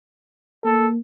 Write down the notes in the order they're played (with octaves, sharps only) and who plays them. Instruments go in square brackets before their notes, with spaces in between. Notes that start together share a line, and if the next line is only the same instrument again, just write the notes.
[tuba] A#3 [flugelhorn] A4